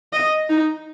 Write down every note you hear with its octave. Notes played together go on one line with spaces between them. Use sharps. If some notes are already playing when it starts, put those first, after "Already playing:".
D#5
D#4